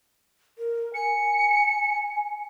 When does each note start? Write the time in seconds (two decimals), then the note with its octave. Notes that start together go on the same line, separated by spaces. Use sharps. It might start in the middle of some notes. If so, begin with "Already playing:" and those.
0.58 A#4
0.94 G#5 C#7